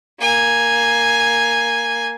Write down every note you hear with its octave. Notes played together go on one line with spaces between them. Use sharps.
A#3 G#5